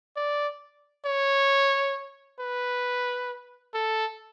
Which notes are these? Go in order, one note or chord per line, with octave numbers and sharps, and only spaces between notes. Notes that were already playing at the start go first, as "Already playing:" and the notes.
D5
C#5
B4
A4